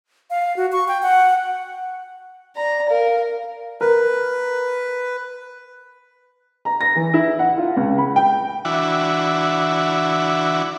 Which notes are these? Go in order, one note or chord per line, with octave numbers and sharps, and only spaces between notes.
F5
F#4
C#6
G5
F#5
D5 A#5
A#4 F5
A#4 B4
A#5
A#6
E3
E4
F#5
F4
C#2
B5
G5
E3 D4 E4 F#4